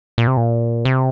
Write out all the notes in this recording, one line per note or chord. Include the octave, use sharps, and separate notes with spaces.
A#2
C3
A#2
C3